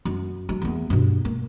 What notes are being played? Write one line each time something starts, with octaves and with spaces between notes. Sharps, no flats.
F#2
F#3
E2 A#3
G2 B2
A#3